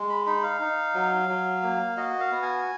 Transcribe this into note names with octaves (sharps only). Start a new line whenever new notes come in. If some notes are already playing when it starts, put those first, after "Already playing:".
Already playing: G#3
B5
D#4 B5
F5
D#4
F#3
F#3
A#3
F#4 D#5
F5
B3
G#5